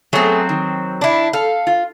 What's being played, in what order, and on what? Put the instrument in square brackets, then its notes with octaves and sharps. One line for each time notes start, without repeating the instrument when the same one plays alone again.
[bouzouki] F#3 C4 [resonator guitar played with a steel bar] A3 B3 G#4
[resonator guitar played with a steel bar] D#3
[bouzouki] D4 E4
[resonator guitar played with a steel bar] A4 [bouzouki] F5
[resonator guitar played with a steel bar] F4